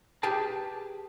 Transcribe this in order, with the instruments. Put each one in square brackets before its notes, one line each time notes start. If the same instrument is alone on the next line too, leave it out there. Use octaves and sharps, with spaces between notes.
[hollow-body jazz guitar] G4 G#4 B4 G5 A5